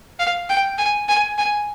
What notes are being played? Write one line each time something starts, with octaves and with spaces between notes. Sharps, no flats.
F5
G5
G#5
G#5
G#5